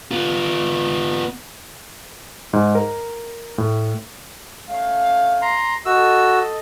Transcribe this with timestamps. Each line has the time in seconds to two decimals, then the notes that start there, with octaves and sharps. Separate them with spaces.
0.11 B3 F4
2.53 G#2
2.75 A#4
3.58 A2
4.70 A3 C#4 F5
5.42 A#5 C6
5.86 F#4 A4 D#5 E6